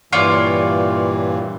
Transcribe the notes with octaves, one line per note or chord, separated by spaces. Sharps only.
G2 A#2 E3 F4 C#5 D5